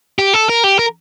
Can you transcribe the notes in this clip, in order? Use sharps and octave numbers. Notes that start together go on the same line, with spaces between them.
G4
A4
A#4
G4
A#4